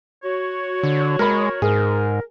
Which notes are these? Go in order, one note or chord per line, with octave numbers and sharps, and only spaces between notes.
F#4 C#5
D3
G#3 A#4 B5
G#2 G#4 A#4